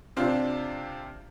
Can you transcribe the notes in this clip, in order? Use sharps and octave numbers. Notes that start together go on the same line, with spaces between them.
C3 C4 D4 F4